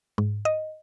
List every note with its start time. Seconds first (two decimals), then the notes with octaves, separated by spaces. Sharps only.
0.18 G#2
0.45 D#5